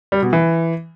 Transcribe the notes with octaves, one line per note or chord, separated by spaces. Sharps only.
G3
B2
E3